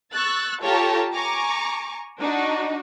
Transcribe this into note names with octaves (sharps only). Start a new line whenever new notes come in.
C#6 E6 F#6 A6
F4 G4 A4 C#5 A5 A#5
G#5 A#5 C#6 D6
D4 D#4 F#4